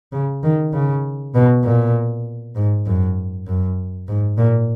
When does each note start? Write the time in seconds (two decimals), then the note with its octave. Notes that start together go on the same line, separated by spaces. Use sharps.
0.13 C#3
0.43 D#3
0.73 C#3
1.35 B2
1.64 A#2
2.56 G#2
2.86 F#2
3.47 F#2
4.08 G#2
4.38 A#2